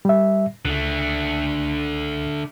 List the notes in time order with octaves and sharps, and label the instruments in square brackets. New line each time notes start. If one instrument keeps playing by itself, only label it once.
[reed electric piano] G3 E5
[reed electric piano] C#2 [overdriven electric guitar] D3 A3